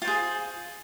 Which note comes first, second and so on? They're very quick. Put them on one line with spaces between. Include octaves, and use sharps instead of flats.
F4 C5 G#4